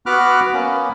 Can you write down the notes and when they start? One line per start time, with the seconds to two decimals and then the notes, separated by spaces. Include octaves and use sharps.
0.06 B3 F#4 B5 D6 F6 F#6
0.54 A#3 B3 C#4